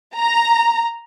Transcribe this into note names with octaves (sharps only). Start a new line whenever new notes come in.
A#5